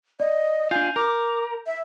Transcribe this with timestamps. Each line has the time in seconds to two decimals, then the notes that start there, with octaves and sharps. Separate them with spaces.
0.20 D5 D#5
0.71 D4 F4 G#5 G6
0.96 A#4 D6
1.66 E5